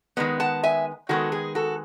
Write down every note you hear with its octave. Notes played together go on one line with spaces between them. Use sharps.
D#3 G#3 B3
F#5 A5
E5 G#5
D#3 G#3 B3 F#4 A4
G#4
F#4 A4